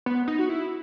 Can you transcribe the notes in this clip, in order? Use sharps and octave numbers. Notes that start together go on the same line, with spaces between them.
B3
D#4
F#4
E4